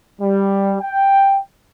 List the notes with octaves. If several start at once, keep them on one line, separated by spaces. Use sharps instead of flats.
G3
G5